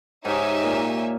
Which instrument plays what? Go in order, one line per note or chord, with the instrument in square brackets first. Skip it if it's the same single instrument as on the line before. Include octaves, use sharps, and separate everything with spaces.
[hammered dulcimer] G#2 [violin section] D#4 G4 C#5 E5 G#5
[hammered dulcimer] A#2